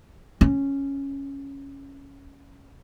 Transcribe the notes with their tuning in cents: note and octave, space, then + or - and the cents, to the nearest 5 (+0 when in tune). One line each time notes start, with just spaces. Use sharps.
C#4 -5